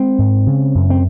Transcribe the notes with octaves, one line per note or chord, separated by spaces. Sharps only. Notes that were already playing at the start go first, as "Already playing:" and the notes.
Already playing: G#3 C4
G#2
C#3
F#2
C4